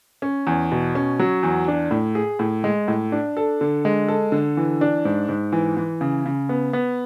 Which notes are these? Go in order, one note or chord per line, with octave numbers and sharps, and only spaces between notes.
C#4
E2
B2
C#4
F#3
E2
D4
A2
G#4
A2
G#3
A2
D4
A4
D3
G#3
A4
D3
E3
D4
G#2
G#2
E3
E3
C#3
C#3
B3
B3